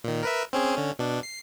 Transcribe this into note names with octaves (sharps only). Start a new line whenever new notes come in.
A#2 D#3
A#4 B4 E5
C4 C#4 G#4
D3 C#4
B2 D4
C7